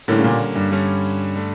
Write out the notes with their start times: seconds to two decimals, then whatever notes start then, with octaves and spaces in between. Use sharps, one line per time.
0.08 A2 D3 G3 A#3 C#4
0.19 C#3
0.24 A#2
0.56 G2
0.71 D3 G3 C#4
1.36 D3 A3